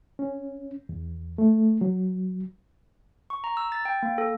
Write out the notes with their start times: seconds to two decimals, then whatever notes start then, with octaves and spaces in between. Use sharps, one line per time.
0.19 C#4
0.89 E2
1.38 A3
1.81 F#3
3.30 C#6
3.44 A#5
3.57 E6
3.72 A6
3.85 G5
4.03 A#3
4.18 A4